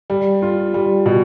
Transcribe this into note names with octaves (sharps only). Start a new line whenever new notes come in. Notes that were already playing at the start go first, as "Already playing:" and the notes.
G3
F4
G3
B2